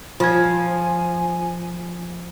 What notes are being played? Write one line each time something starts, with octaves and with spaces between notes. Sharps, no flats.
F3 F4 G#5 G#6